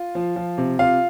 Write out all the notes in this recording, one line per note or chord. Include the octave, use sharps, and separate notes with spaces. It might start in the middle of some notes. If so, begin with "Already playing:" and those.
Already playing: F4
F3
F3
C3
C3 F4 F5